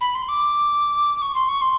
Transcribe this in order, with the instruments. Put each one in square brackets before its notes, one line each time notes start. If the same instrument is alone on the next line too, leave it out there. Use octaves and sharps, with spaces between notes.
[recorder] B5
C6
D6
C#6
C6
C#6
C6